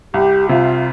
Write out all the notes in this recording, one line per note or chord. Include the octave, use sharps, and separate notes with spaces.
C2 G4
C3 F4